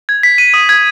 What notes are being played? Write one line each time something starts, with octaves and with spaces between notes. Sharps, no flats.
G#6
B6
D#7
D#6
G#6